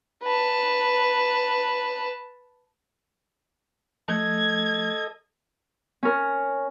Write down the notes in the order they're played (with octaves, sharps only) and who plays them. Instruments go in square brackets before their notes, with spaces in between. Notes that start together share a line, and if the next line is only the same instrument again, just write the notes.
[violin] B4 A5
[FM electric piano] F3 A3 [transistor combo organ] A4 D#5 [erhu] G#6
[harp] C#4 A#4